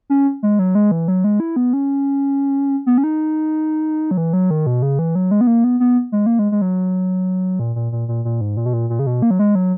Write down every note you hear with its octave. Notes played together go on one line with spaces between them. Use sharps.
C#4
G#3
F#3
G#3
E3
F#3
G#3
E4
B3
C#4
B3
C#4
D#4
F#3
E3
F#3
D#3
B2
C#3
E3
F#3
G#3
B3
A#3
B3
B3
G#3
A#3
G#3
G#3
F#3
A#2
A#2
A#2
A#2
A#2
G#2
A#2
B2
A#2
A#2
C#3
B2
A#3
F#3
G#3
F#3